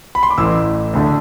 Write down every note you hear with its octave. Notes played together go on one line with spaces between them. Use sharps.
B5
C6
D6
A1 A2 E3 E6
D2 D3 A3